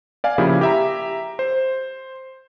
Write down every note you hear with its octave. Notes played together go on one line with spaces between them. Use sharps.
D5 F5 G#5
C#3 F3 A#3 E4 G4 G#4
G4 E5 A#5
C5